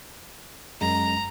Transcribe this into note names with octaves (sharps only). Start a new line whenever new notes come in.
F#2 G#3 A#5